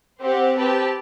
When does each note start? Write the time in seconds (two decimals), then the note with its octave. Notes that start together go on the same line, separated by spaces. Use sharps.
0.22 C4 G4 C5 F#5
0.58 C4 G4 B4 A5